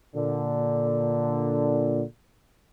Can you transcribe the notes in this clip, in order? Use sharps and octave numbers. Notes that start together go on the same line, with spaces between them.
A#2 D3